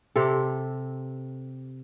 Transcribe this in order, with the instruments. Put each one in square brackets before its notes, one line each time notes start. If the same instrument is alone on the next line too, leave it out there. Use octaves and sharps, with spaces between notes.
[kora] C3 G4 A4